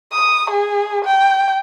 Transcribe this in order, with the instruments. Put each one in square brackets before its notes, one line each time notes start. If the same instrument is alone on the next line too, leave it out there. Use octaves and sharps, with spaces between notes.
[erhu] D#6
G#4
G5